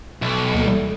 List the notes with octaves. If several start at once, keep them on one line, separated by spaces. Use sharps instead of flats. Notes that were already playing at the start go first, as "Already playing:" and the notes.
B1
D2 A#3 A4 E5
E3 G3 D#4 A4